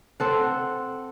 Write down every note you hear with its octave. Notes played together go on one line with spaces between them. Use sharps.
C4 A4 F#5